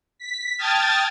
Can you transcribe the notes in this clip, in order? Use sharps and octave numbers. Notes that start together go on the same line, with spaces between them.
B6
G5 A5 D#6 F6 G#6 A6